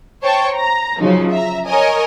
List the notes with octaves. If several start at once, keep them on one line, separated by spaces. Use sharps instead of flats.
C5 C#5 G5 A5 C#6
A#5
C#3 F3 F#3 D#4
E5 A#5
A#4 C#5 D#5 G#5